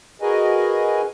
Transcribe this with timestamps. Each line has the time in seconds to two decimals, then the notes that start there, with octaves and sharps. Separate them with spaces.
0.22 F#4 G#4 A#4 B4 D#5 G#5